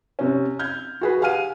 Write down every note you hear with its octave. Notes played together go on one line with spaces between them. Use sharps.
C3 C#4
F6 G6 G#6
F#4 G#4 B4
G4 F5 F#5 G#5 F6 D#7